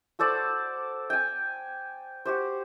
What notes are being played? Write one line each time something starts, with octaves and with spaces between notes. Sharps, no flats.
F#4 A4 C5 D5
G5 G#5
F#4 G4 C5